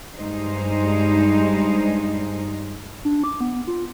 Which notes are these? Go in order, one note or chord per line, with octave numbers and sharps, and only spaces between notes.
G2 G#3 D#4 C5
D4
D6
B3
F4